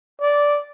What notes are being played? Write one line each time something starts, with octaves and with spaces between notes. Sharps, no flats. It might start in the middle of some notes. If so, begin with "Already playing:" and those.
D5